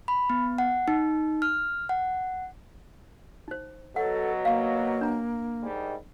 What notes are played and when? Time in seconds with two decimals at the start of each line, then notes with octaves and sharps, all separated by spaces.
0.08 B5
0.30 B3
0.58 F#5
0.88 D#4
1.42 F6
1.89 F#5
3.48 D#4 C5
3.96 B2 F#3 A4 F#5
4.45 A#3 F5 C#6
5.01 D4 A#5
5.62 G#2 D#3 G3